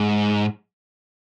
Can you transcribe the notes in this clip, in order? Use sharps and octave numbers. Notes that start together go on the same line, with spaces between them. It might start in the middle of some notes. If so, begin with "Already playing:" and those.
Already playing: G#2